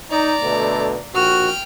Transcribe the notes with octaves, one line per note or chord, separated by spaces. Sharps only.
D#4 D5 A#5
B2 D3 A3
A#1 F#4 G5 F6